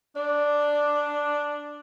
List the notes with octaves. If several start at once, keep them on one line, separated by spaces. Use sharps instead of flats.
D4 D5